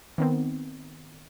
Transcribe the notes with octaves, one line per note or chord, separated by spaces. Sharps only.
D#3 B3 C4